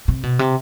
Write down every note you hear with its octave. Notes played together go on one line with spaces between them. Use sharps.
C3
B2
C3